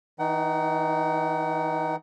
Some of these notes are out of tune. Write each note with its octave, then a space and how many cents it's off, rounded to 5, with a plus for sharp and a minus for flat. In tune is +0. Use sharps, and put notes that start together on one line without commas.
E3 -35 D#4 +0 F#5 +35